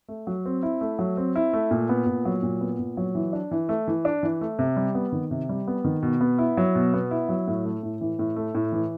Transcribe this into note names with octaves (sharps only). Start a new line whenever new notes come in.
A3
F#3
C4
E4
A3
F#3
C4
E4
A3
A#2
B3
A#2
F#3
A#2
B3
A#2
F#3
E3
D4
E3
A3
E3
D4
E3
A3
C3
G3
B3
D#3
C3
G3
B3
D#3
B2
B3
E4
F#3
B2
B3
E4
F#3
A2
A3
A2
E3
A2
A3
A2
E3